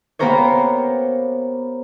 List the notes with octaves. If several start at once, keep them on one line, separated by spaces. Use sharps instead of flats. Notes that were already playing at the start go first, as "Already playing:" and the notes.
A#3 B3 G4 A#4 C5 C#5